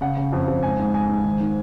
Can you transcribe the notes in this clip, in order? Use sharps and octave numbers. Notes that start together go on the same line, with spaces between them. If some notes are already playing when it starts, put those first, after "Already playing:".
C#3 F#5
C#3
F2
F2
G#2 G#5
G#2
G#2 G#5
G#2
D#3
D#3